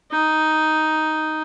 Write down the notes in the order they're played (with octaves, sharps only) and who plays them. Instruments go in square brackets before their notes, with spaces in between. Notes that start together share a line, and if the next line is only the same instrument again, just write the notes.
[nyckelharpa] D#4